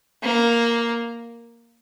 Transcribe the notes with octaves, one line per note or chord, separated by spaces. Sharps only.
A#3